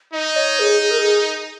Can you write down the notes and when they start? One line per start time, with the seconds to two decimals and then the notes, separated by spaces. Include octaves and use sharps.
0.13 D#4 D#5
0.36 C#5
0.60 G#4
0.82 G#4
0.91 A#4
0.98 G#4